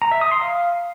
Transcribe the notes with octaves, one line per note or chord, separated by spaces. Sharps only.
A#5
E5
D#6
C6
F5